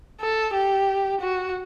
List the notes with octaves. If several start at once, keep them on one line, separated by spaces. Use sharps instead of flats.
A4
G4
F#4